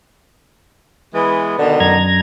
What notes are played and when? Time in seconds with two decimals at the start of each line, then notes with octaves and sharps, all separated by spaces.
1.14 E3 G#3 B3
1.58 B2 D3 D#3
1.80 F#2 A#5 G#6